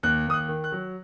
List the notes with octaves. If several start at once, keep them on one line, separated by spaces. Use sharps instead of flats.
D#2 F#6
D#2 D#6
F#6
D#3
F#6
F#3